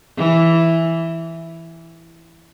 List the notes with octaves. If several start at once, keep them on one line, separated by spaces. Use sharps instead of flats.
E3